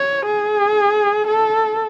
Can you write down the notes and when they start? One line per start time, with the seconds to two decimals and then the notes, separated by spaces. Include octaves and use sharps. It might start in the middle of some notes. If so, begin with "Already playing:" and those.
Already playing: C#5
0.26 G#4
1.28 A4